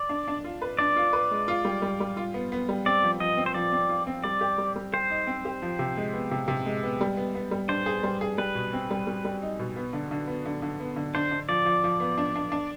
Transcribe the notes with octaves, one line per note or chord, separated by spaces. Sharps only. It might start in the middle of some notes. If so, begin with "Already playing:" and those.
Already playing: D5
D4
D4
F4
B4
D4 D5
F4
B4
G#3
F4
G3
G3
G3
F4
B3
B3
G3
C4 D5
F3
F3 D#5
C4
C5
F3 D5
C4
F4
C4
G3 D5
G4
G3
G3
G4 C5
D#4
C4
G4
F3
C3
G#3
B3
C3
C3
G#3
B3
G3
B3
B3
G3
D4 C5
G#4
G3
G#4
G3 B4
B2
C4
G3
G3
G3
D#4
B2
B3
D3
D3
B3
D3
D3
B3
D3
D4 C5
D4
F3 D5
F3
F3
B3
D4
D4
D4